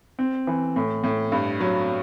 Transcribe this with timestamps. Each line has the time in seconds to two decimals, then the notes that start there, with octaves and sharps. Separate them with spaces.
0.19 C4
0.47 E3
0.76 A2
1.04 A2
1.32 G2
1.60 F#3